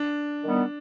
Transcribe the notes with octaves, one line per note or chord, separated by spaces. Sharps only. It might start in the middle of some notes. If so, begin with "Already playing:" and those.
Already playing: D4
D#3 G3 B3 D#4